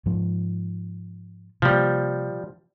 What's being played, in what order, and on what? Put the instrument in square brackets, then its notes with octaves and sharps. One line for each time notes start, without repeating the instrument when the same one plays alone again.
[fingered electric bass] G#2 F3
[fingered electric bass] C3 A#3 [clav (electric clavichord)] F3 G3